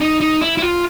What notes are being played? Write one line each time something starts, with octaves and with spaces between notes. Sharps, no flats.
D#4
D#4
E4
E4
F4